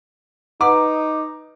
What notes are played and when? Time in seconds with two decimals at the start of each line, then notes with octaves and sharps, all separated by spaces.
0.61 D#4 B4 F#5 A#5 D6